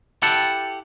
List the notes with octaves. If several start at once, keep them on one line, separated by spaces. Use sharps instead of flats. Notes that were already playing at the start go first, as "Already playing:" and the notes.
E4 G4 A4 F#5 G5 A5